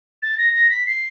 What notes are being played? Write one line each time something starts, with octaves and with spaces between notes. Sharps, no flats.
A6
A#6
A#6
B6
C7